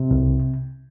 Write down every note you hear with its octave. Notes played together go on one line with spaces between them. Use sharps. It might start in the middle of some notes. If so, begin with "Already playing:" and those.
Already playing: C3
C2